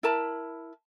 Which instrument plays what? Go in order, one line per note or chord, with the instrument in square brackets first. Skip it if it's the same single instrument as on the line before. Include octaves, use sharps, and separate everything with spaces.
[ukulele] E4 A#4 A5 B5